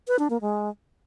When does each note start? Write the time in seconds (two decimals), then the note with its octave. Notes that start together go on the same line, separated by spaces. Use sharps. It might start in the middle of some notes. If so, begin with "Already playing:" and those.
0.08 B4
0.19 D4
0.30 A#3
0.41 G#3